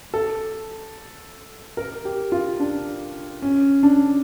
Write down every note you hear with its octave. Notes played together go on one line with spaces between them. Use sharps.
A4
A#4
G4
F4
D4
C#4
D4